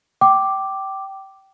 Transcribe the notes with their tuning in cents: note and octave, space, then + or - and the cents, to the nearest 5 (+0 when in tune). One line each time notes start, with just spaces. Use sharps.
G5 -20 D6 +0